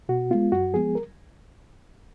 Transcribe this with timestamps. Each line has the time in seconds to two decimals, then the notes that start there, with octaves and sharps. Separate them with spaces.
0.09 B2 F#4
0.30 G#3 B3 F4
0.52 F#2 F#4
0.74 F3 G#3 B3 G#4
0.95 A#4